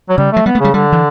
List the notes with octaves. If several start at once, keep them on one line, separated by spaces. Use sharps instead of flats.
F#3
C#3 G3
F#3 A3
G3 B3
A3
C#3 G3
D3 G3
E3